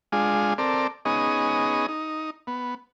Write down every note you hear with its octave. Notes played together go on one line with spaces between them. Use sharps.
G#3 D4 F4 G#4
C4 A4 A#4 D5
B3 C#4 D#4 G#4 D#5
D#4
B3